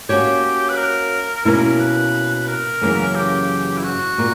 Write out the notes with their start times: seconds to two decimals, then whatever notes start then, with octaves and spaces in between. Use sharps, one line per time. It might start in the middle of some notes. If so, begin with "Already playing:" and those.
0.09 A#3 C#4 F#4 G4 C#5
0.69 B4
0.77 A#4
1.45 B2 A#3 C#4 E4 A#4
1.79 B4
2.35 B4
2.48 A#4
2.81 F#2 C#3 E3 A#3 C#4
3.15 G4
3.77 E4
3.84 F#4
4.18 A#2 A#3